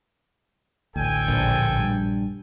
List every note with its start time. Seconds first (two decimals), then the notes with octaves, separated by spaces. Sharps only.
0.96 A1 D2 A4 G5 G#5
1.28 A#1
1.79 G2